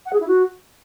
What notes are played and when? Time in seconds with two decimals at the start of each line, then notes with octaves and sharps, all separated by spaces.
0.06 F#5
0.13 G#4
0.20 E4
0.27 F#4